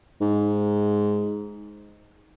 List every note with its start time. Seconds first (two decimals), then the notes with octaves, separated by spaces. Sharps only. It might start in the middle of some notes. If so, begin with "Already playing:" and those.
0.21 G#2